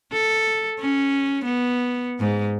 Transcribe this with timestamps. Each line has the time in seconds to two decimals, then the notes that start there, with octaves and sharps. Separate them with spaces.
0.13 A4
0.79 C#4
1.44 B3
2.20 G#2